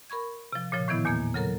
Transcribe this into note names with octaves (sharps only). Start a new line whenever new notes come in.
A#4 B5 C#6 G#6
C3 F3
A#2 C#3 F3
A2 D#3 E3 B3 E4
E2 A#2 A#3 G#6
C#3 F#3 A4 A#4 A#5